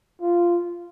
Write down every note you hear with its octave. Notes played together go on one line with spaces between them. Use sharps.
F4